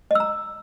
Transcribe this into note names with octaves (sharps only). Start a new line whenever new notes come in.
D#5 A#5 E6